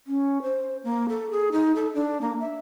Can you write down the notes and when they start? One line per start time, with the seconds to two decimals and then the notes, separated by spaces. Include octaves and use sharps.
0.07 C#4
0.43 C5
0.84 A#3
1.09 A4
1.31 G#4
1.52 D#4
1.76 A4
1.94 D4
2.21 A#3
2.40 E5